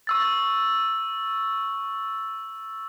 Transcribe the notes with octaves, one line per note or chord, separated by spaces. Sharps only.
C#6 E6 A6